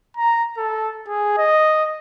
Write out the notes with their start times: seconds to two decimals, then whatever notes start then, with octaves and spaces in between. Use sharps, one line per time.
0.17 A#5
0.57 A4
1.08 G#4
1.38 D#5